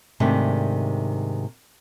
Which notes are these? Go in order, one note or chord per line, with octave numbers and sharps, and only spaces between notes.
G#2 C3 D#3 A3 D4